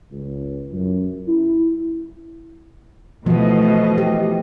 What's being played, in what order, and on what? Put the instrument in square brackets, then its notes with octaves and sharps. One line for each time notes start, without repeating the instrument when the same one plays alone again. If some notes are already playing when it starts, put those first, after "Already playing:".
[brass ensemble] C#2
F#2
E4
[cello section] B2 A3 D#5 [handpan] E3 F3
[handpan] G4